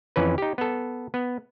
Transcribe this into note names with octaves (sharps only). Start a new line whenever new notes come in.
F2 E3 C#4 B4
D#4 G4
B3 A4
B3